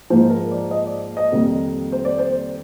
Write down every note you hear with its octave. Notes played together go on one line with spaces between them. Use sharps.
G#2 F3 A#3 C5
A#4
D5
D#5
D5
D#5
F2 D#3 G3 A#3
C5
D5
C5